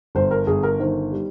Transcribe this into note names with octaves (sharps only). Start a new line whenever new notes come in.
G1 C5
A#4
G1 G#4
A#4
D#3 C5
G3